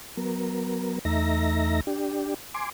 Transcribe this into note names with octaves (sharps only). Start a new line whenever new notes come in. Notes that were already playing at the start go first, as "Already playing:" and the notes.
F#3 B3 A#4
E2 A3 D#4 E5 A#5 A#6
D4 G4
G#5 C6 D6